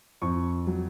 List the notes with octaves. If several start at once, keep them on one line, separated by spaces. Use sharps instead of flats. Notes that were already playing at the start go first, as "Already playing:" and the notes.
F2 C#6
F#3